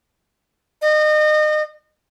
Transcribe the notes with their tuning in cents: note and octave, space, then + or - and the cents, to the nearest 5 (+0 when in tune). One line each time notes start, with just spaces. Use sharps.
D#5 -35